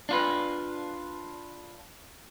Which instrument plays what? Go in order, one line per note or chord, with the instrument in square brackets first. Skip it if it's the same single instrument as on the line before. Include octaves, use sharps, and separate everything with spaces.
[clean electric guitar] D4 F4 B4